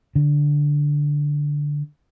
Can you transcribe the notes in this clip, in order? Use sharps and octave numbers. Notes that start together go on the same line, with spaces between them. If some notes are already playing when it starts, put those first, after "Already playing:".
D3